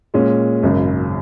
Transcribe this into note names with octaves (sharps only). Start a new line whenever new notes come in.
A#2 G#3 C#4
G#1 F#2 C#3